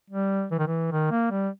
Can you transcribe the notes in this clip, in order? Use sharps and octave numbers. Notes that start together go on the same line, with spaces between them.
G3
E3
D#3
E3
D#3
A#3
G3